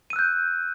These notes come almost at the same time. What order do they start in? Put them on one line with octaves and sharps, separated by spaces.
D#7 E6 F#6 G6